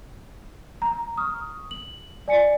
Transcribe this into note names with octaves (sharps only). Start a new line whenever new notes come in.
A#5
C#6 D#6 F6
F#7
D5 G#5 C#7